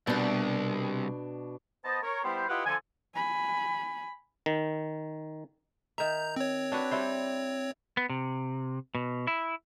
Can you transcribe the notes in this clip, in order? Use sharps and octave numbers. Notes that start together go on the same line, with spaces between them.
C2 B2 D4
B3 C5 D#5 A5
A#4 C#5
G3 B3 E4 G4 C5
E4 F4 G4 B4 D#5 F#5
D3 F3 A4 G#5
G#5 B5
D#3
D#3 E5 A#5 G6
C4 C#5
D4 F#4 B4
G3 E4 C5
B3
C3
B2
E4